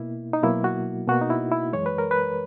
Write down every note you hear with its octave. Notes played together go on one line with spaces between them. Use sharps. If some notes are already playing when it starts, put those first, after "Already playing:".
Already playing: B2 A#3 E4
D#4
B2 F#3 A#3 E4
F#4
B2 A#3 F#4
D#4
E4
E4
F#2 E3 G#3 C#5
B4
A#4
B4